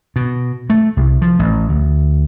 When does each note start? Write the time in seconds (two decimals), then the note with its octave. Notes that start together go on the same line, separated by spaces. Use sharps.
0.16 B2
0.70 A3
0.97 C2
1.22 F3
1.39 A1
1.69 D2